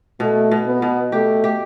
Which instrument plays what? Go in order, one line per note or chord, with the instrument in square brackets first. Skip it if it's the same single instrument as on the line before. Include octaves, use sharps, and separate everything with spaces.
[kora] B2 [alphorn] A3
[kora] B2
[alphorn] B3
[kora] B2
[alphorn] A3 [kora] G4
[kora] G4